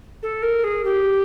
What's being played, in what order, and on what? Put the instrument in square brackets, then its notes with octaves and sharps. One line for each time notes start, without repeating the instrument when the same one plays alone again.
[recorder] A4
A#4
G#4
G4